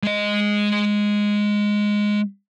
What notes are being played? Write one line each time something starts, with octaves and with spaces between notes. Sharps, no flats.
G#3 D#5